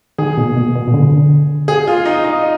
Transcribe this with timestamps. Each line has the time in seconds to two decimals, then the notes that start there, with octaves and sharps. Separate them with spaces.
0.18 D#3 G#4
0.37 B2
0.56 B2
0.75 B2
0.88 B2
0.94 D3
1.68 G#4
1.88 F4
2.05 D#4
2.24 D#4